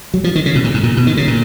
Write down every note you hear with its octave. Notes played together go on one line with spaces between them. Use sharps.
F#3
F3
D#3
C#3
B2
A#2
G#2
A#2
B2
D#3
C#3
A#2